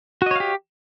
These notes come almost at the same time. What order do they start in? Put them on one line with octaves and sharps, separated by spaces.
F#4 D#5 C#5 F5 G4